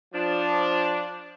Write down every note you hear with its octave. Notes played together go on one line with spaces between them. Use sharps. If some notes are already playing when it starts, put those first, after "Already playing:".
F3 D4